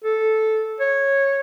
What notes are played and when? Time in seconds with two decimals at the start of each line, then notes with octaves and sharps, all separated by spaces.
0.04 A4
0.80 C#5